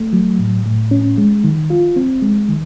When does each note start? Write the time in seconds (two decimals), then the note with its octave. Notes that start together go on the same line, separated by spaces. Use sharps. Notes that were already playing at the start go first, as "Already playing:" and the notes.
Already playing: A3
0.13 F#3
0.39 A2
0.66 A2
0.91 C#4
1.18 G#3
1.44 D#3
1.70 F4
1.96 C4
2.22 G#3
2.48 D#3